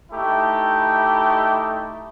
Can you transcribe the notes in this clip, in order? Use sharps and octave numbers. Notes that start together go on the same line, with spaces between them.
A3 D#4 E4 G4